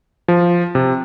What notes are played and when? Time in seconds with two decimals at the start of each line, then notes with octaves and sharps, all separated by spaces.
0.28 F3
0.75 C3